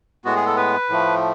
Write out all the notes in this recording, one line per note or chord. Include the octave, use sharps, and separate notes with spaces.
A2 G#3 B3 F#4
G#4
A4
B4
A2 F3 A3